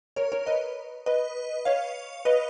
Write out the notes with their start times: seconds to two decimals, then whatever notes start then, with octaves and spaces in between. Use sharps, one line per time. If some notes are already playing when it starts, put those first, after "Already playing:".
0.16 A#4 C#5
0.32 A#4 C#5
0.46 B4 D#5
1.06 B4 D#5
1.65 C#5 F5
2.25 B4 D#5